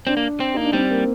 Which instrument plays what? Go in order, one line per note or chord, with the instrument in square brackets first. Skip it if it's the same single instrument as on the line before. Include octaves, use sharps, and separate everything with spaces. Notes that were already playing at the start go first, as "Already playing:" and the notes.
[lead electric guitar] C4 [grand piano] D4
[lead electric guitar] A#3
C4
[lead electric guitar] A#3 [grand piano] D#4
[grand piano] D4
[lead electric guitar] G3 [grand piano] C4
[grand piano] A#3